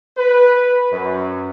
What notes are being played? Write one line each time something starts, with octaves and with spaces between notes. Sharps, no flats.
B4
F#2